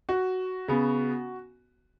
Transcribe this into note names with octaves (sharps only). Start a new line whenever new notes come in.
F#4
C#3 B3